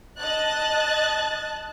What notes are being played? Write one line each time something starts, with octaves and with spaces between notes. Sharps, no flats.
D#5 A5 F#6 A6